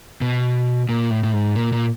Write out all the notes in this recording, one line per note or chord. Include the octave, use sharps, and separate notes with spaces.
B2
A#2
A2
A2
G#2
A#2
A#2